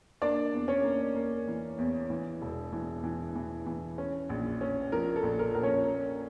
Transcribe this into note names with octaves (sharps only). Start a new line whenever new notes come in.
A#3 D4 D5
E2
C#4 C#5
A#3
A#3
E3
E2
E3
E1
E3
E3
E3
E3
C#4
A#1
C#4
F3 A#4
A4
A#1
A#4
A#1 A#4
C#4 C#5
A#3